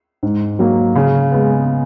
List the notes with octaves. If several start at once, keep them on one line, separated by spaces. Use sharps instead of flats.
G#2
F#3 A#3
C#3
G#3 B3